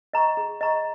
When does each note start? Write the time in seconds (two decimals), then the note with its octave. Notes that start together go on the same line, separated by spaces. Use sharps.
0.14 D#5 A#5 C#6
0.37 G#4
0.61 D#5 A#5 C#6